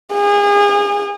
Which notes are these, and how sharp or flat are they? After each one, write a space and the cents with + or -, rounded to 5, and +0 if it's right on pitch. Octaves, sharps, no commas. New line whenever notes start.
G#4 -35